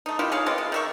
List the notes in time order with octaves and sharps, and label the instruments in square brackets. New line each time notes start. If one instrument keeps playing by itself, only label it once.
[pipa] A3 D#4
D#3 E4 F4 G4
G#4 C#5 F5
G#3 B3 C4 F4
C3
D#3 E5 C#6